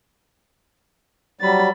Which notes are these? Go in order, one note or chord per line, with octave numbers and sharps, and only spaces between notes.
F#3 G3 B5 A6